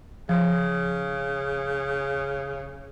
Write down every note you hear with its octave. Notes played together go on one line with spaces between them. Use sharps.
C#3 F3